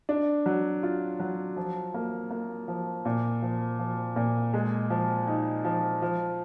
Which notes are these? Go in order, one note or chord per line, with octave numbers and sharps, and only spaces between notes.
D4
F#3
F4
F#3
F3
A#3
A#3
F3
A#2
F3
F3
A#2
G#3
F3
D#4
F3
F3